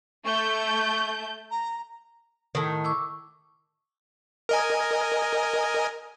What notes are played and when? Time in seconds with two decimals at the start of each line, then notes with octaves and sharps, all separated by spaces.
0.25 A3 C#6 G6
1.51 A#5
2.55 A2 D#3
2.84 C#6 D6 E6
4.49 A#4 D#5 G#5